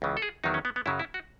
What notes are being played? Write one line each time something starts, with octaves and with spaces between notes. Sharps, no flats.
C#2 C#3 E3
A4
G#4
E2 D#3 F#3 D#4
C#4
B3
B3
F#2 C#3 F#3 E4
E4
F#4